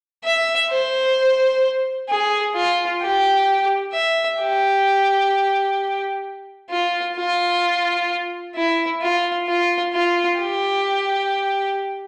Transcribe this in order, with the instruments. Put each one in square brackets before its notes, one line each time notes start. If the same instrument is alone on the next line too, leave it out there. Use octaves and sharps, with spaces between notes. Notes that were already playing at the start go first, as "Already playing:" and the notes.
[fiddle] E5
C5
G#4
F4
G4
E5
G4
F4
F4
E4
F4
F4
F4
G4